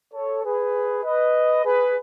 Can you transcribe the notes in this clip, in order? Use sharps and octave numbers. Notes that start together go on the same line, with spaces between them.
A4 C#5
G#4 B4
B4 D#5
G#4 B4